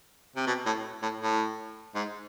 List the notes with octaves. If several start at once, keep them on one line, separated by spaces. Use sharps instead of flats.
C3
B2
A2
A2
A2
G#2